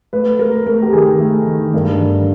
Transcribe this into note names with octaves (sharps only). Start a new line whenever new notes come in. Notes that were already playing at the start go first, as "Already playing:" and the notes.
A3 B4
A3 A#4
A3 A#4
G4
D#3 G#4
A3
D#3
G2 A#4
D3